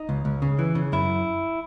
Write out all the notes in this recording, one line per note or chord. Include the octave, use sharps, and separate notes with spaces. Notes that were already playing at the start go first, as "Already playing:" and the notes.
Already playing: D#4
C#2
C#2
C#3
E3
C#3
F#2 E4